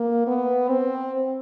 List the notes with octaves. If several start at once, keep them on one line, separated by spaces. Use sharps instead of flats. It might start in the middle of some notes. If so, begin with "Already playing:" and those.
Already playing: A#3
B3
C4